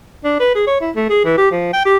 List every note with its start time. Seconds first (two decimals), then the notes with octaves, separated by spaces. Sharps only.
0.24 D4
0.40 B4
0.55 G#4
0.67 C#5
0.80 E4
0.96 A3
1.09 G#4
1.25 E3
1.37 G4
1.51 F3
1.73 G5
1.85 G4